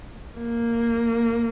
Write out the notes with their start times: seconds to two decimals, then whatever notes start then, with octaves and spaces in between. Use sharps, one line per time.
0.37 A#3